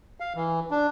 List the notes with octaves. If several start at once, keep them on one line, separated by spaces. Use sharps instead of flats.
F5
E3
D4